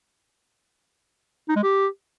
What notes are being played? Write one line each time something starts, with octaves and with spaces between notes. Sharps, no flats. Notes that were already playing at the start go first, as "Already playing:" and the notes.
D#4
G#3
G4